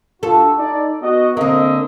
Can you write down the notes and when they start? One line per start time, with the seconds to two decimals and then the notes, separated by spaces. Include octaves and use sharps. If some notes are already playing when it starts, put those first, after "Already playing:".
0.23 D4 F4 F#4 A4
0.59 D#4 D5
1.03 B3 F#4 D#5
1.37 D3 A#3 C4 A#4 D#5